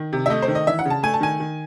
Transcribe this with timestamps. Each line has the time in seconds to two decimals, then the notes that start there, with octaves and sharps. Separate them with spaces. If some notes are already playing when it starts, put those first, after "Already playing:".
Already playing: D#3
0.13 C3
0.26 E5
0.30 A3 D#5
0.42 C5
0.48 D#3
0.55 D#5
0.67 E3 E5
0.79 F#5
0.85 C#3
0.90 A5
1.03 A3 G#5
1.14 A5
1.21 D#3 G#5
1.40 D#3